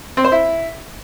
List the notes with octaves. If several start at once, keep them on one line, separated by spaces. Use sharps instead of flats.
C4
C5
E4